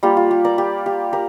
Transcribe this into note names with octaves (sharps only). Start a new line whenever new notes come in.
G3 A#3 F4 G4
F4
G4
A#4 D5
G4
G4
G4 A#4